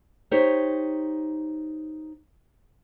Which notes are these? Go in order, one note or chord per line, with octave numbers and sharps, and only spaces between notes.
D#4 G4 C5 C#5